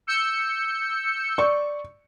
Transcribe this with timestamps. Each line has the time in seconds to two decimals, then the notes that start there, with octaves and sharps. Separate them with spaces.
0.07 E6 G6 C#7
1.38 D5 C#6